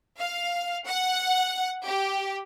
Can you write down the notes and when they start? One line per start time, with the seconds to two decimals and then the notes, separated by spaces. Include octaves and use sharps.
0.19 F5
0.86 F#5
1.87 G4